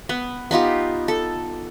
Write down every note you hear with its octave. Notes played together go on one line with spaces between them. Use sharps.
B3
B3 D#4 F4 G4
A4